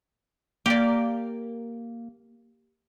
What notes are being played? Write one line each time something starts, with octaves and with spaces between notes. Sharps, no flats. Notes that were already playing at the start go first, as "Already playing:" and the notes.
A#3 G4 D5